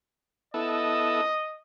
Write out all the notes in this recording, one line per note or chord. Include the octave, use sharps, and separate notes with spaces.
B3 E4 A4 D#5